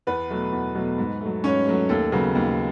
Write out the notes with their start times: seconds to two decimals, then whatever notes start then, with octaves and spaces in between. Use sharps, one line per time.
0.07 E2 B3 B4
0.30 B2 F#3 A3
0.52 E2
0.75 B2 F#3 A3
0.98 G#2
1.21 F#3 A3
1.44 G#2 C#4 C#5
1.67 F#3 A3
1.89 D#2 A3 A4
2.12 C#3 F#3 B3
2.35 D#2